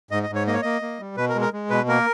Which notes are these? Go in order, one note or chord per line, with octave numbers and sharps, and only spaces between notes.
G#2 D#5
D#5
G#2
C#5
A#3 D#5
C#5
A#3 D#5
A#3
G3
B2 B4
A#4
G#3
A#4
G#3
B2 B4
A#3 A#4